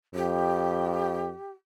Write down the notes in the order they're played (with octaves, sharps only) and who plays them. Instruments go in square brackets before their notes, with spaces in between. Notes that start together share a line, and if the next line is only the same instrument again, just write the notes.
[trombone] F2 [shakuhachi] G4